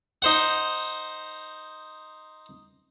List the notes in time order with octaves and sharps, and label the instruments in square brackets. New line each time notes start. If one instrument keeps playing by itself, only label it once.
[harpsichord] D#4 C5 F#5